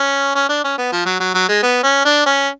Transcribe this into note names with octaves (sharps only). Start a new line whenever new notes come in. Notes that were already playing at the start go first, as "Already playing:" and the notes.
Already playing: C#4
C#4
D4
C#4
B3
F3
F#3
F#3
F#3
G#3
B3
C#4
D4
C#4